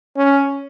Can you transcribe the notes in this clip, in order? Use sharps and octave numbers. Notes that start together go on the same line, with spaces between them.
C#4